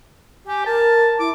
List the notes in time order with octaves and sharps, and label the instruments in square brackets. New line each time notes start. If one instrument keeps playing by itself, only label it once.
[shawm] G4 [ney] G#5
[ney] A#4 [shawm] A5
[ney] E4 [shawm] D6